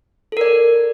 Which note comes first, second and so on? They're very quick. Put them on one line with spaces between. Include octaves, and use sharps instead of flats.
A4 A#4 D5